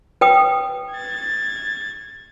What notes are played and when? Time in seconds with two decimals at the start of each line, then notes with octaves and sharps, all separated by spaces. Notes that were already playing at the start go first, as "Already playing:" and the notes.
0.21 B4 G5 D#6
0.94 G#6 A6